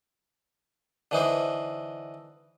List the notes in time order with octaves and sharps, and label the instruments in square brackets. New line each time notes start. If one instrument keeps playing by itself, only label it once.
[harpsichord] D3 E3 D#4 C5